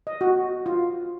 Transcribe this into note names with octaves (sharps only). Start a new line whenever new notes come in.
D#5
F#4
F4